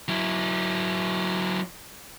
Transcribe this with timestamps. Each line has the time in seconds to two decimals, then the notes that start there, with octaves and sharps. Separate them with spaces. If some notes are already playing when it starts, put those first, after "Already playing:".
0.08 F#3 E4